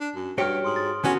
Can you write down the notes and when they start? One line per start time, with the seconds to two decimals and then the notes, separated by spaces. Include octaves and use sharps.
0.01 D4
0.15 F#2
0.38 G2 F#4 G4 C#5 F6 D7 G7
0.64 G#2 C6 D#6 F#7
0.76 A6
1.04 D3 B3 C#4 F#4 G#6